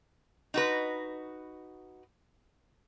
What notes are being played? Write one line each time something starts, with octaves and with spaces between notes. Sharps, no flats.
D#4 F#4 B4